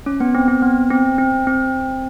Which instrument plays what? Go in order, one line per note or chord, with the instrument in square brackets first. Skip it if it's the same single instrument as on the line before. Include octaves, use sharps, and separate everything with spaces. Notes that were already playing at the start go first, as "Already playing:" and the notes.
[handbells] C#4
B3
C4
C4
B3
C4
C4
C4